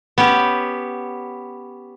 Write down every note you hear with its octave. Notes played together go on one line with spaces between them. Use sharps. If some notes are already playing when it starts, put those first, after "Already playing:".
B3 C#4 G4